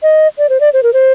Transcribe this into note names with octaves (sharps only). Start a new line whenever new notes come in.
D#5
D5
C5
D5
C5
A#4
C5